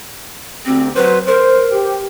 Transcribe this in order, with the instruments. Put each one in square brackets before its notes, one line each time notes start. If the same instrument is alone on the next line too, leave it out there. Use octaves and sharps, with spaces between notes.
[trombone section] D2 G4 [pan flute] C4
[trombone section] F#3 C5 [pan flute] B4
[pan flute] A#4 [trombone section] C5
[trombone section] G4